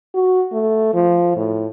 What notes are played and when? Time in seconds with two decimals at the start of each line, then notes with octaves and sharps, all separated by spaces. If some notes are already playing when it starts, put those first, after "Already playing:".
0.15 F#4
0.53 A3
0.94 F3
1.36 A2